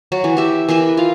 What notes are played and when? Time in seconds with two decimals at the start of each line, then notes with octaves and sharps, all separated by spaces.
0.12 F#3 F#4
0.24 E3
0.37 G4 E5
0.68 E3 A#4 B4 E5
0.97 F4 F5